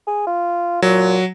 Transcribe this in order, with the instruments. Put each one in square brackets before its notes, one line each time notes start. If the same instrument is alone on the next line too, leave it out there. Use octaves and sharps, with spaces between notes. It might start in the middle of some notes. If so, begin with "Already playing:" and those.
[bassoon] G#4
F4
[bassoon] A#2 [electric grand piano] F#3